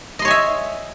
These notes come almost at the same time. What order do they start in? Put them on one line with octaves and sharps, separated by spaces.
D#5 C6 C#5 G#5 E5